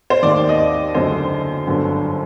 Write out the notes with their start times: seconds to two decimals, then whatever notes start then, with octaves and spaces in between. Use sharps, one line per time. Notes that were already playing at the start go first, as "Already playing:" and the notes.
0.10 C5
0.23 D#2 D#3 D5
0.49 D#5
0.59 D5
0.95 F#1 F#2 D3 C5
1.67 G1 F#2 D3